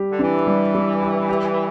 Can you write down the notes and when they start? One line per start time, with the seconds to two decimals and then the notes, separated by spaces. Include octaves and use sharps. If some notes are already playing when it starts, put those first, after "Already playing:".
Already playing: G3 G4
0.09 D3
0.19 E3 D4
0.47 G3
0.75 G3
1.02 G4
1.29 G4